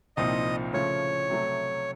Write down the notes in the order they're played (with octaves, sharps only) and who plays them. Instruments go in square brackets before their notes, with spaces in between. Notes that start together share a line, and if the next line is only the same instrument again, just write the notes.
[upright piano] C2 A#2 F3 C4 D#4 [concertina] D#5
[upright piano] C#3 F3 A3 [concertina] C#5
[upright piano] C3 F#3 A3